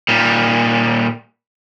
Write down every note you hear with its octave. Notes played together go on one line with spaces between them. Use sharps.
A#2 G3